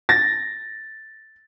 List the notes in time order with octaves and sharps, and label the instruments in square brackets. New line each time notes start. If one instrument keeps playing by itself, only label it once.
[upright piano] A6 A#6